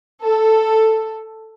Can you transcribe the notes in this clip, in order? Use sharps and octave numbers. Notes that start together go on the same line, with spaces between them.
A4